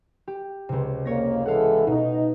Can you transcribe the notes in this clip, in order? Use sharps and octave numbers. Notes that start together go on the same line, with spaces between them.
G4
C#2 C3
F2 A#3 C#5 A#6
E3 G#3 A4 F5 F#5
B2 D#4